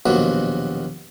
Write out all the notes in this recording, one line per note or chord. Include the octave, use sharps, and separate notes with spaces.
A#1 D#2 B2 F#3